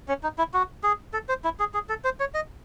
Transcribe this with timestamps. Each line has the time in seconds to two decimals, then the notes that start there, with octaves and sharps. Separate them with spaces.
0.08 C#4
0.23 D#4
0.38 E4
0.54 F#4
0.83 G#4
1.13 A4
1.29 C5
1.44 E4
1.59 G#4
1.74 G#4
1.89 A4
2.04 C5
2.20 C#5
2.34 D#5